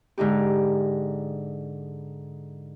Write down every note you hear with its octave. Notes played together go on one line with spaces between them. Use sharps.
G#2 D3 D#4 G4